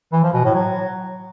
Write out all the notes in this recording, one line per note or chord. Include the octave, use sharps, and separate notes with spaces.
E3
F3
B2
A2
F#3